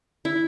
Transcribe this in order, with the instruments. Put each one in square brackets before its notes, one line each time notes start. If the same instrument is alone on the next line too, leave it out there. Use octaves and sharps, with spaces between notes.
[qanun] E4